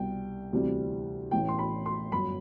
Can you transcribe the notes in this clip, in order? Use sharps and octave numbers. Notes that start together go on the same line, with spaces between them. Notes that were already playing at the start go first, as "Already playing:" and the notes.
Already playing: C2 B2 G3 G5
D2 C3 E3 G3
A1 A2 E3 G5
C6
B5
C6
G1 F#2 F#3 B5